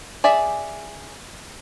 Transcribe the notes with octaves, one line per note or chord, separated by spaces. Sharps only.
G#4 D5 E5